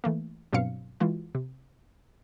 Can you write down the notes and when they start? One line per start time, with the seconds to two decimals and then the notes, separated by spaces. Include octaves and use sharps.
0.04 E3 A3 A#3
0.53 G2 B2 F#3 C4 F5 C#7
1.00 E3 G#3 F4 F#4
1.35 C3